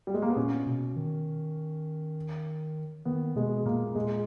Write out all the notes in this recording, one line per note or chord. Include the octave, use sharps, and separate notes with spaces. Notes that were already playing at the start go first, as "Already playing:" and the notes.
G3
G#3
A#3
B3
A#2 C#4
B2
D#3
D#3 B3
B2 G#3
A#2 A#3
A#2 G#3